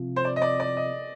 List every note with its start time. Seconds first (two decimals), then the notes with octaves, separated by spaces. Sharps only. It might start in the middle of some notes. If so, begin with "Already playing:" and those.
Already playing: C3 F3
0.16 C5
0.25 D5
0.36 D#5
0.42 D5
0.60 D5
0.77 D#5